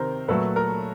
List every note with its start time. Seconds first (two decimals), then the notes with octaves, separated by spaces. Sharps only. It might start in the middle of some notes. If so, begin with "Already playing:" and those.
Already playing: C3 D#3 A#4 C5
0.28 A#2 F#3 A3 A4 B4
0.56 A#4